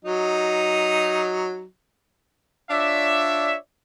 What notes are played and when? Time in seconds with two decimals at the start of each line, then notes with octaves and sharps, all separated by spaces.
0.05 F#3 D#4
2.70 D4 F4 C#5 D5 E5